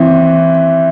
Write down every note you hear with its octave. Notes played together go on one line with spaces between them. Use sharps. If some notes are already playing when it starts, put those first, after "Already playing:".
Already playing: E3 C4